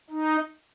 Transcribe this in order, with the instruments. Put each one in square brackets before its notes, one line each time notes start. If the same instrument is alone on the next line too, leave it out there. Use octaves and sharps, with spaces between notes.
[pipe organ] D#4